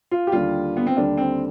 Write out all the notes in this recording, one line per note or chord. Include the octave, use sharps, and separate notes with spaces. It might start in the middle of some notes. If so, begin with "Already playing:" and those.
F4
G4
D#2 D3 G3 F4
B3
C4
D#2 D3 G3 D4
C4